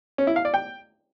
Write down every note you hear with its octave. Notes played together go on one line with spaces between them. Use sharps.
C#4
E4
F5
D5
G5